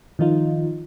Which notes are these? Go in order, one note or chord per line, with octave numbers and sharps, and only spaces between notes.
D#3 F3 D#4 F4